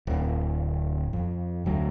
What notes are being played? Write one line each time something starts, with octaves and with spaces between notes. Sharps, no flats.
D1
F2
D2 F#3